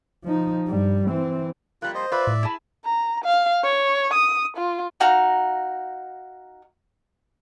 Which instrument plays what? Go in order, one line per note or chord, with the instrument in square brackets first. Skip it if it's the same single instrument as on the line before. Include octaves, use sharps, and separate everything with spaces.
[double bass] F3 D#4
G2 G3
E3 C4
[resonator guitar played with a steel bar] F2 G3 A#3 [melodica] F4 [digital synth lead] F#6
[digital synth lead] C5 [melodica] D#5
[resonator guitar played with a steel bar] F4 B4 [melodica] D5 E5
[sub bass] A2
[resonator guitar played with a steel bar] E4 G#4 A5 [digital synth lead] B5
[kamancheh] A#5
F5
C#5
D#6
F4
[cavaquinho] D#4 F#4 F5 A#5